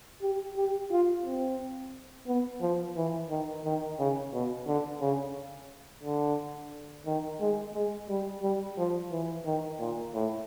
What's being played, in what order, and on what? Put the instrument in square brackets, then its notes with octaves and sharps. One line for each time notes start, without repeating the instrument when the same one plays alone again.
[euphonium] G4
G4
F4
C4
B3
F3
E3
D#3
D#3
C#3
B2
D3
C#3
D3
D#3
G#3
G#3
G3
G3
F3
E3
D#3
A#2
A2